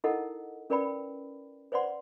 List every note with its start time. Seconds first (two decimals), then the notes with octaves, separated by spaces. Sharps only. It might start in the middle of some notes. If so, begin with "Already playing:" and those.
0.04 D#4 E4 A4 A#4 D#5 F#5
0.70 C#4 A#4 B4 D5 G5 B5
1.72 B4 C5 D5 F#5 C6